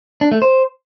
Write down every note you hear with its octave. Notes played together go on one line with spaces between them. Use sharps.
D4
A3
C5